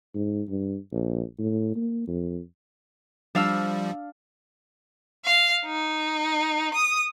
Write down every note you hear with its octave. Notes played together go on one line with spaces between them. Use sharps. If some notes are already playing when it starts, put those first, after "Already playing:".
G#2
G2
A#1
A2
A#3
F2
F3 G3 D4 F5 E6
F5
D#4
D#6